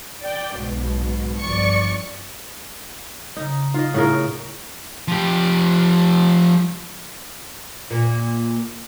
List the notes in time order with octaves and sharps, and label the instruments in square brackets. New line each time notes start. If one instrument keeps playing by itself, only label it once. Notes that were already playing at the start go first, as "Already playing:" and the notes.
[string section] D5 G5
B1 G#2 B2
G1 F3 D5 C#6 C#7
[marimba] C#3 A#5 [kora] D#4
[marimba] D#4 [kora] F4 D#5
[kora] A2 C#3 A#4
[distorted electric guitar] F3 G4
[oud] A#2